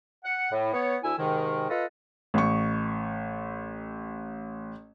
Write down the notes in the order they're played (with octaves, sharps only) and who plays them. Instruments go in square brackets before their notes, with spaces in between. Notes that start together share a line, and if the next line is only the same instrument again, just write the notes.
[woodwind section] F#5
A2
B3 C#5
D2 E4 G#5 E6
G#2 C3 D#3
F4 A4 B4 D#5
[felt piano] A1 C#6